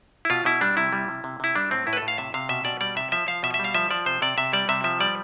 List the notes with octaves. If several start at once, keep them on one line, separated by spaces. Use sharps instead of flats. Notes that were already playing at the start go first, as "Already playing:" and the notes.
E4
B2 F4
B2 E4
G3 D4
C3 E4
G3
C3
C3
C3 E4
G3 D4
A2 C4
A2 E4
B4
A4
A2
F5
C3 E5
C3 F5
B2 E5
B2 D5
G3 D5
C3 E5
F3 E5
F3 F5
B2 E5
E5
G3
F5
F3 E5
F3 D5
C3 C5
C3 D5
C3 E5
G3 D5
C3 E5
F3 E5
G3 D5